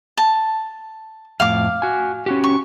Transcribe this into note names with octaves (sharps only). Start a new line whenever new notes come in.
A5
F2 A2 F5 D6
F#4 G#5
C#4 F#4 G4
C#6